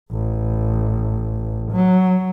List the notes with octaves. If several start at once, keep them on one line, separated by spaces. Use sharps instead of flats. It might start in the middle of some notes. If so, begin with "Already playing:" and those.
A1
F#3